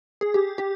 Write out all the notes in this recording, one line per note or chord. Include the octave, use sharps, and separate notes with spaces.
G#4
G4
G4